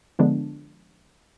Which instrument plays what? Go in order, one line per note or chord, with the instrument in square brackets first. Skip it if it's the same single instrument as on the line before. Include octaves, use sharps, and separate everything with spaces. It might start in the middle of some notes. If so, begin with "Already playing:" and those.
[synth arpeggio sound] D3 F3 G#3 B3 D4